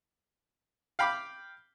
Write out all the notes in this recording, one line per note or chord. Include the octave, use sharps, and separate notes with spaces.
F5 G5 B5 D6